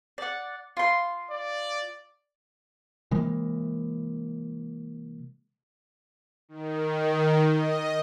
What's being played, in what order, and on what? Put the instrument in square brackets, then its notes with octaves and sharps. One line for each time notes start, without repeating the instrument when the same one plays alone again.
[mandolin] D5 F#5
F4 C6
[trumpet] D5
[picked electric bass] C3 E3 G#3 A#3
[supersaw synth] D#3
D#5